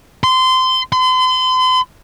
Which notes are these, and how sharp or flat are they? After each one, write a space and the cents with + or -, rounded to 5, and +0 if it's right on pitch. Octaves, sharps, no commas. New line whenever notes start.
C6 -20
C6 -40